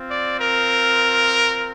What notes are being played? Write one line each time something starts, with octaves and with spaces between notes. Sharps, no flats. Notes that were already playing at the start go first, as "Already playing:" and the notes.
Already playing: C4 F4
D5
A#4